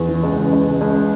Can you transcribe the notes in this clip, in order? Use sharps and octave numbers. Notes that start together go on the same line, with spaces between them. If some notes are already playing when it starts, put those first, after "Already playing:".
Already playing: E2
E3
C#2
C#3
C#2
C#2
C#2